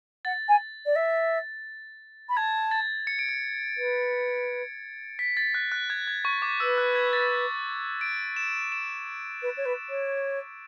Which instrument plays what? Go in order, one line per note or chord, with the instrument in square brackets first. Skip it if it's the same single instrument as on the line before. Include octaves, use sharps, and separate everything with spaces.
[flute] F#5 [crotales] A6
[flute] G#5
D5
E5
B5
[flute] A5 [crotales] G#6
[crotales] A6
C#7
D7
C#7
[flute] B4
[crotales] B6
A6
F#6
F#6
G#6
G#6
C#6
D6
[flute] B4 [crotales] E6
[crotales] F#6
G#6
A6
D7
E7
E7
[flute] B4
C#5
B4
C#5